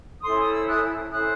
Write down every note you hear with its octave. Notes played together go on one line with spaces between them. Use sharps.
C#4 E4 A4 C5 C6 D#6
D#6
E6
D#6 F#6
C#4 E4 A4 C5 D#6 F#6